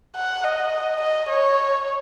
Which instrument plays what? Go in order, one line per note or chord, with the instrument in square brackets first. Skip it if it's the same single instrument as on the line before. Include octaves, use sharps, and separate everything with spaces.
[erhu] F#5
D#5
D#5
C#5